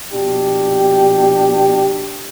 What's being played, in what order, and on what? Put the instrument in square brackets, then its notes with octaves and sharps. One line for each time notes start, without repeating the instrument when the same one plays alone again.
[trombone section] A#1 B2 D4 G4